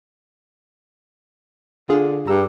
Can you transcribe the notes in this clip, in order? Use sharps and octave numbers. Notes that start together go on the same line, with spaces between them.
D3 F4 G#4 F5
G2 G4 A#5 E6